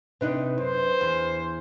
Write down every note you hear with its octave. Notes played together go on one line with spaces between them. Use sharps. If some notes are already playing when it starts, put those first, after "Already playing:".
C3 D4 D#4 B4
F#2 C5
E2